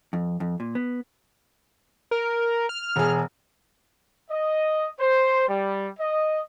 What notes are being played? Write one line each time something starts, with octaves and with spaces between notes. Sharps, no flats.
F2
F2
A#2
B3
A#4
F6
E1 G#4
D#5
C5
G3
D#5